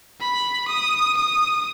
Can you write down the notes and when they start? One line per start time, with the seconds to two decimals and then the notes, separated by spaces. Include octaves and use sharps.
0.20 B5
0.68 D#6
1.16 D#6